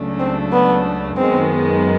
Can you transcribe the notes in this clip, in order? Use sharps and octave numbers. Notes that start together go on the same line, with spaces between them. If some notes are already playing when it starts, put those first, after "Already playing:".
Already playing: C#2 C#3 F#3 A3 D4
C4
B3
F#2 D#3 G#3 B3 C4